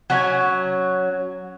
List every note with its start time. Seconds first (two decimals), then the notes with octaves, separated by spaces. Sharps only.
0.10 F#3 C#4 G#5